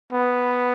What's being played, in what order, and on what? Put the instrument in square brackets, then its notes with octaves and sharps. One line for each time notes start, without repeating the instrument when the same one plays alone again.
[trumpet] B3